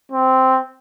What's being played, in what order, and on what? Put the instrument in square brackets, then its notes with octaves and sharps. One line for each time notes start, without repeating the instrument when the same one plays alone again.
[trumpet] C4